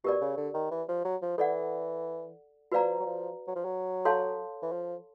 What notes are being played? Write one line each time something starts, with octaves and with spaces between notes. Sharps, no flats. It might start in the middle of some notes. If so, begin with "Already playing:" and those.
B2 G4 A#4 D5
C#3
D3
D#3
E3
F3
F#3
F3
E3 A4 D5 F#5
F3 F#4 B4 D5 F5 A#5
F#3
F3
F#3
F3
F#3
A4 C#5 F5 A5 C6
E3
F3